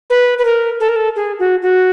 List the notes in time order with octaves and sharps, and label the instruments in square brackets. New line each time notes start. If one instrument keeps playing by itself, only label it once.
[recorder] B4
B4
A#4
A4
A#4
A4
G#4
F#4
F#4